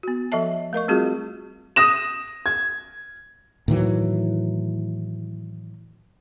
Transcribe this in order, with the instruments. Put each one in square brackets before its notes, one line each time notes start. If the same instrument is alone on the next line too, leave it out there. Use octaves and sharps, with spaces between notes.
[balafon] B3 F#4
F3 A4 D#5 E5 A5
A3 A#4 D#5 C#6
G3 A3 C4 F4 F#4 G#4
[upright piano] D#6 A#6 E7
G#6
[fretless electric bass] A2 D#3 E3 F#3